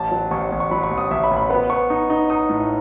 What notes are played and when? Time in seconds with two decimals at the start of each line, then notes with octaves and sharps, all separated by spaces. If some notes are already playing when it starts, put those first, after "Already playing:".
Already playing: A1 A5
0.12 F#3
0.31 A1 C#6
0.52 A1
0.60 C#6
0.71 F#3 B5
0.84 C#6
0.91 A1
0.98 D#6
1.11 A1 E5
1.24 B5
1.31 A1
1.37 B5
1.50 B3 B5
1.70 B3 C#6
1.90 D#4
2.10 D#4
2.30 D#4 D#6
2.50 A2